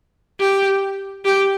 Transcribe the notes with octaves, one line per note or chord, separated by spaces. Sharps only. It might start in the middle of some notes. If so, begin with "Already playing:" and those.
G4
G4